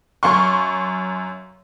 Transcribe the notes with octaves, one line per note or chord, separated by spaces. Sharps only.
F#2 F5 C6 C#6